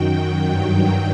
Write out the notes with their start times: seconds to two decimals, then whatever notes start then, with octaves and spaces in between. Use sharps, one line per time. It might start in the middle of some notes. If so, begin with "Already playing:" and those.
Already playing: F#2 D#3 F#3 G5
0.47 G2 D#3 F#3